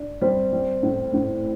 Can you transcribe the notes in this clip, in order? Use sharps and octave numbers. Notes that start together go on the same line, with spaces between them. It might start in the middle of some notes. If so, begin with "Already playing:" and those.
Already playing: D4
G3 C4
G3
A2
A2